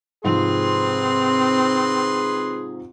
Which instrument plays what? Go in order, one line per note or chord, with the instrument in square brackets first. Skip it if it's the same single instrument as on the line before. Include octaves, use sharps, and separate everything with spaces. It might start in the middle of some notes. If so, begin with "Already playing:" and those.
[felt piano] G#2 C3 F3 [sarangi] C4 [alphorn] G#4 [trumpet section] B4 C6